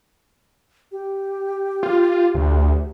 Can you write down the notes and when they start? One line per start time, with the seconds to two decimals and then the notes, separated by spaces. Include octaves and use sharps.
0.92 G4
1.83 F4
2.35 D2